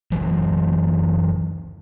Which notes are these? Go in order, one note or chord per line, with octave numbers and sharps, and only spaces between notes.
F#1 E3 F#3